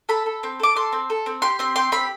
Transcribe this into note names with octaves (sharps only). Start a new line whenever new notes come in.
A4 B5
A4
C4
A4 D6
A4 C6
C4
A4
C4
G4 C6
C4 C6
G4 C6
C4 B5